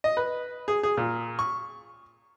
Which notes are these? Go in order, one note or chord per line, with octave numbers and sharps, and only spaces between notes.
D#5
B4
G#4
G#4
A#2
C#6